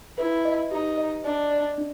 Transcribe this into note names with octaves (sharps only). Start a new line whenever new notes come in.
E4 B4
D#5
D#4 G4
D#5
D4 D5
D5
D4